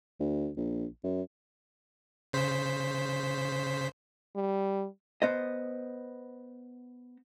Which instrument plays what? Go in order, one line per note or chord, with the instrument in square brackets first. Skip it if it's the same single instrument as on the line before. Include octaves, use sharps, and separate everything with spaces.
[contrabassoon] D2
A#1
F#2
[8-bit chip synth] C#3 C5 B6
[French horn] G3
[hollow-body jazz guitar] B3 C5 D#5